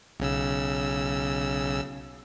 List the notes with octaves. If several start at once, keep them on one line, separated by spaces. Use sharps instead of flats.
B1 C#3 E6